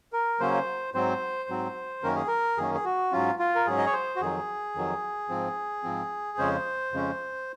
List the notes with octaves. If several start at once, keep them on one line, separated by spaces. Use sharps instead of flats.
A#4
C#3 F#3 A#3 C#4 C5
G#2 F#3 C4 C5
G#2 F#3 C4
F#2 D#3 A#3 C#4 A#4
G#4
A#4
F#2 D#3 A#3 C#4 G#4
G#4
F#4
G#2 F#3 C#4 F4
F4
A#4
G#2 F#3 C#4 G#4
D#5
C#5
C5
F#4
F2 D#3 F#3 G#4
F2 D#3 F#3
G#2 F3 C4
G#2 F3 C4
F2 C#3 G#3 C#4 C5
F2 C#3 G#3 C#4